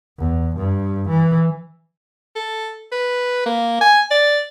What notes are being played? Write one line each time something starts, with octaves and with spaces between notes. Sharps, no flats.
E2
G2
E3
A4
B4
A#3
G#5
D5